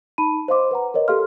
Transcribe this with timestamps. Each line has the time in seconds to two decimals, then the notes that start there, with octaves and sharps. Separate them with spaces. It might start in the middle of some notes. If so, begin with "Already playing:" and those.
0.18 D#4 A5 B5 D#7
0.48 C5 D#5 F5 C6 D6
0.71 B4 F#5 A#5
0.94 A#4 B4 C#5 D#5
1.08 G4 A4 A#4 F5 C6 F6